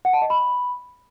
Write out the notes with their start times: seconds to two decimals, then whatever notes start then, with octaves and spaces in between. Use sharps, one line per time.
0.05 F#5
0.13 A5
0.22 D#5
0.30 B5